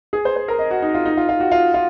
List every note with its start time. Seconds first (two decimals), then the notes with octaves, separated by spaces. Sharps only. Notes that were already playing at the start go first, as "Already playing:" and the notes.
0.13 G#4
0.25 C5
0.36 C5
0.48 A#4
0.59 D#5
0.70 F#4
0.82 D#4
0.95 F4
1.05 D#4
1.17 F4
1.29 F4
1.40 F#4
1.51 F4
1.74 F4